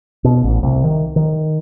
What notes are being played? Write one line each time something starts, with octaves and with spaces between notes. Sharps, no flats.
B2
A1
C2
D#3
D#3